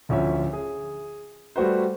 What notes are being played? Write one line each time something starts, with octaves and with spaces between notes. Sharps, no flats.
D1 D2 F3 C#4 E5
G#4
G3 A3 F#4 B4 C5